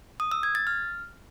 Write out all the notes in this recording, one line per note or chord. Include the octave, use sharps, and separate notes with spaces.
D#6
E6
G#6
A6
F6